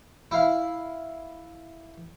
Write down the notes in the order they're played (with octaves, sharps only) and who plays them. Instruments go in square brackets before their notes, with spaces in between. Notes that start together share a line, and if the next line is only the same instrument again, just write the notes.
[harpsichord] E4 F5